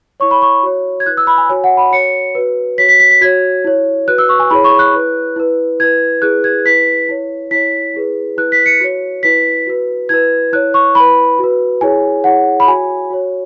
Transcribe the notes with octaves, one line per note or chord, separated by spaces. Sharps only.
E4 C#5 C#6
B5
C#6
F#4 C#5
G#6
E4 B4 F#6
E6
B5
G#5
F#4 C#5 G#5
F#5
B5
F#4 C#5 C#7
F#4 B4
F#4 C#5 B6
B6
B6
B6
F#4 C#5 G#6
E4 C#5
F#4 B4 F#6
E6
C#6
G#5
E4 G#4 C#5 B5
C#6
F#6
E4 B4
E4 B4
E4 B4 G#6
E4 G#4 B4 F#6
G#6
E4 B4 B6
E4 C#5
E4 C#5 B6
E4 G#4 B4
E4 B4 F#6
B6
C#7
F#4 C#5
E4 B4 B6
F#4 B4
E4 B4 G#6
E4 C#5 F#6
C#6
E4 B4 B5
F#4 B4
E4 G#4 C#5 G#5
E4 G#4 C#5 F#5
B5
F#4 C#5 G#5
F#4 C#5